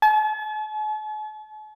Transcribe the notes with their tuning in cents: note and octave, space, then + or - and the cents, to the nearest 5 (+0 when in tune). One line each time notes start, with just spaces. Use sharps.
A5 -45